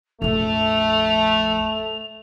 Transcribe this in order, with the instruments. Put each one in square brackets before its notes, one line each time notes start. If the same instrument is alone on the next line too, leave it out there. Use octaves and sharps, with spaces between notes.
[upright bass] A#1 F2 [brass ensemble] A3 [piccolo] F7